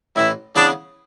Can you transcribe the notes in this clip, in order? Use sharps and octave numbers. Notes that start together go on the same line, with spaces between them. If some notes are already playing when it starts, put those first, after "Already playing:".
A1 A2 E3 E4
C#3 E3 B3 D4 E4 G#4